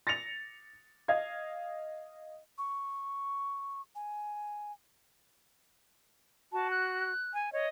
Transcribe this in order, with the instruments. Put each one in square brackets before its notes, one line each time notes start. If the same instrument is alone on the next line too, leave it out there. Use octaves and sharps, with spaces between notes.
[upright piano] A6 A#6 C#7 F7
D#5 F5 G#6
[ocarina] C#6
G#5
[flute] F#4 [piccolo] A5
[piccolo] F#6
[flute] G#5
[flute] C#5 [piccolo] D#5